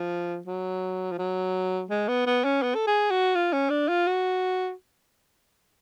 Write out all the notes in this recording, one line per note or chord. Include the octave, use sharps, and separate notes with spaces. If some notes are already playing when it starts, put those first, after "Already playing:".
Already playing: F3
F#3
F3
F#3
G#3
B3
B3
C#4
B3
A4
G#4
F#4
F4
C#4
D4
F4
F#4